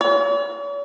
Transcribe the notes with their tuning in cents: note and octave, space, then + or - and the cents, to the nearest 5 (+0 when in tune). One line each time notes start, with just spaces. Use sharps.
C#5 +45